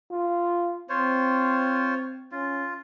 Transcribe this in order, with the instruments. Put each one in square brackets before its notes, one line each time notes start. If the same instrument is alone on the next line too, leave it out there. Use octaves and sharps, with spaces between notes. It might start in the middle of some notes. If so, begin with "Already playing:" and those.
[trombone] F4
[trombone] C4 [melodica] F4 C5 C#5
[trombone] C#4 [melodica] F4